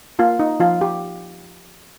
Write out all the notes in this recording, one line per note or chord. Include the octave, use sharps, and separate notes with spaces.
A#3 F4
D#4
F3 F4
G4